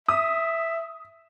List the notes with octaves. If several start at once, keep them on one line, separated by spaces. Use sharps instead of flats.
E5 D#6